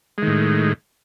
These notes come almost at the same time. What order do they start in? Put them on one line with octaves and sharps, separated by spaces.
G#3 D#3 A2